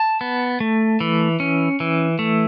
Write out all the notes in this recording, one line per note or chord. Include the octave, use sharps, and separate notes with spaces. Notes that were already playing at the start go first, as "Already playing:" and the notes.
Already playing: A5
B3
A3
E3
C#4
E3
A3